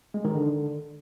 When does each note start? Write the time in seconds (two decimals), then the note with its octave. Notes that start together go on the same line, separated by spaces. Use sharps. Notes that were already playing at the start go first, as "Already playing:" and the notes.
0.14 G#3
0.25 D#3
0.35 D3